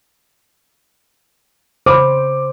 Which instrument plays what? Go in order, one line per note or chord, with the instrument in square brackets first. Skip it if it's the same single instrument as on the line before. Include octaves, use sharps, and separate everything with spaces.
[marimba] C#3 B5 [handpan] C5 [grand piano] D6